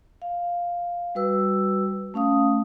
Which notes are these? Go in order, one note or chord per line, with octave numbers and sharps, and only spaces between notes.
F5
G3 F#4 B4 E6
A3 C#4 F5 D#6